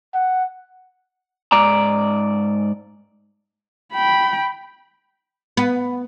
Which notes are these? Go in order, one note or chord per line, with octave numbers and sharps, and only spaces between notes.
F#5
G#2 D5 A#5
G5 B5
B3